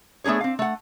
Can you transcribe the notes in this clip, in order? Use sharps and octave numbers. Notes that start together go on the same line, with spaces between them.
A3 B3 D4 G#4 C#5
C4 F5
A3 F#5